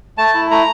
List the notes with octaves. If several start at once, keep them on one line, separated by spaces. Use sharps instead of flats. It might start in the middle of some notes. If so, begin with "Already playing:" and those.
A3 A5
E4
A3 A#5